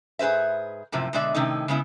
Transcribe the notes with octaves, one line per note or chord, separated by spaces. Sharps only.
G#2 G#4 B4 C5 E5
F#2 A2 C3 F3
B2 D3 G#3 D5 E5
A2 C3 D#3 A3 C#4 D#4
C#3 G#3 B3 E4